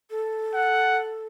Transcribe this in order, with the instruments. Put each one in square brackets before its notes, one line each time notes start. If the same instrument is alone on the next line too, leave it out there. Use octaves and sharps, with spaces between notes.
[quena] A4
[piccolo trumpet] F#5